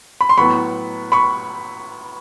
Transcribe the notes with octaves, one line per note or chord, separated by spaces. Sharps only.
B5
C6
A2 F#3 B3 B5 C#6
B5 C#6